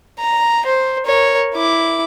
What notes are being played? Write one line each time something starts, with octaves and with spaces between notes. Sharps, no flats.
A#5
C5
A#4 C#5
E4 D6